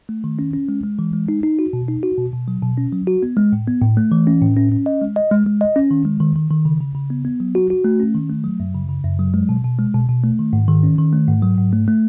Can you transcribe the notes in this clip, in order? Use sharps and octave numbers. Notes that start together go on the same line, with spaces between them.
A3
D#3
C#4
C#4
G#3
G#3
E3
G#3
D#4
D#4
F#4
B2
D#4
F#4
B2
B2
F#3
B2
C#4
F#3
F#4
B3
G#3
A2
B3
A2
A3
E3
C#4
A2
C#4
C#4
D#5
G#3
D#5
G#3
G#3
D#5
C#4
D#3
G#3
D#3
D#3
D#3
C#3
C#3
C#3
B3
B3
F#3
F#4
F#4
A3
C#4
D#3
A3
F#3
F#2
C#3
C#3
F#2
F#3
G#3
B2
B2
G#3
B2
B2
A3
D#3
G#2
D#3
C#4
D#3
A3
G#2
F#3
G#2
A3
A3